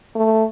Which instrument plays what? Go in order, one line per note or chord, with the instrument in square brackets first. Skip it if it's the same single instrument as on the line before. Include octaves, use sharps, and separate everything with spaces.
[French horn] A3